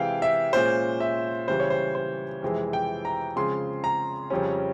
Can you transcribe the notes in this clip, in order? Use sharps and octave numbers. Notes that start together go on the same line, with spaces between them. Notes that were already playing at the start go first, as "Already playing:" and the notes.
Already playing: C3 E3 G#3 F5 G5
E5
A#2 G#3 C#4 C5
E5
C#3 E3 G3 C5
C#5
C5
C5
F2 C3 E3 G#3
G5
A#5
C#3 F3 G#3 C4 C6
A#5
F2 C#3 G3 C#4